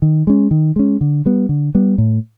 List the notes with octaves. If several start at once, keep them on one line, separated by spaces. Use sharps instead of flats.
D#3
G#3 C#4
D#3
G#3 C#4
D3
G3 B3
D3
G3 B3
A2